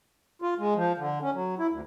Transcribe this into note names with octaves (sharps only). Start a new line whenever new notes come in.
F4
G#3
F3
D3
C#4
F#3
E4
D2